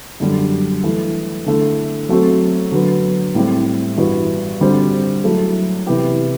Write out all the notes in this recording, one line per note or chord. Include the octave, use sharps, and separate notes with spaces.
F#2 D3 G3 D4
E3 A3 E4
D3 A3 E4
F#3 A3 C4 F#4
D3 F#3 B3
A2 G3 C4 G4
G2 E3 B3 F#4
D3 G3 C4 F#4 C5
F#3 A3 E4 A4
C3 E3 B3 E4 G4